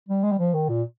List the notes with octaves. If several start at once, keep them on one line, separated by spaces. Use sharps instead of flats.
G3
G#3
G3
F3
D#3
A#2